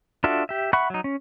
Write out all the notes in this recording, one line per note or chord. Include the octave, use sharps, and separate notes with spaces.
D4 F4 F#4 A4 E5
G4 E5
E5 F#5 B5 C#6 F#6
F#3 D#4
C#4